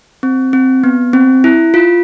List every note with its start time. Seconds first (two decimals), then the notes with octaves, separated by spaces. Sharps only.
0.23 C4
0.53 C4
0.84 B3
1.13 C4
1.44 E4
1.74 F4